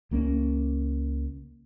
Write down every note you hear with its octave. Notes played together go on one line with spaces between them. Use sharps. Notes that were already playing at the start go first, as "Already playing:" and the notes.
C#2 A#3 C#4